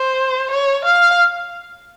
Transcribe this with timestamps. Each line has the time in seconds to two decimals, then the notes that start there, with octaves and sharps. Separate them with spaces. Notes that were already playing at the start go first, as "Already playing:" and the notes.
Already playing: C5
0.51 C#5
0.85 F5